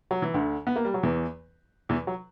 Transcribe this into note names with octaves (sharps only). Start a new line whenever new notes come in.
F#3
E3
D2 D3
B3
A#3
G3
F#3
E2 E3
E2 E3
F#3